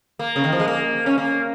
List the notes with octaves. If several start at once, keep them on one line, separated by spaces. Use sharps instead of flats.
A#3
C#3
D#3
F3
G#3
A#3
C#4
A#3